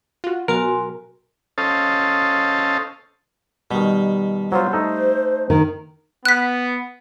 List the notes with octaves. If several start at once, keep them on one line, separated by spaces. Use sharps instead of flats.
F4 F#4
B2 F#3 F#4 A#4 G#5 C6
C#4 A4 C5 D#5 F5 A5
B2 D#3 G3
F#3 B3 F4 C5
A3 D#4 A4
D#3
B3 F#6 B6